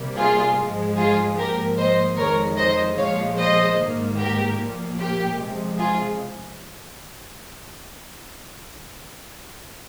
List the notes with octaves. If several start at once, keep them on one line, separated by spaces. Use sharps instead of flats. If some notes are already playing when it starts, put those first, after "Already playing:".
Already playing: C3 G3 A#3
F4 G#4
G#2 F3 G#3
F4 G#4
G#2 F3 A#3 G4 A#4
C5 D#5
F2 D#3 G#3 A#4 C#5
C5 D#5
A#2 F3 G#3 C#5 F5
C5 D#5
G#2 D#3 A#3
G4 A#4
A#2 F3 A#3
G4
C3 F3 G#3
F4 G#4